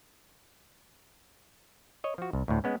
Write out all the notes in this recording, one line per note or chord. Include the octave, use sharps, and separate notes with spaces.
C#5 D#5
F3 F#4
C2
D2 A2
G#3 B3 C#4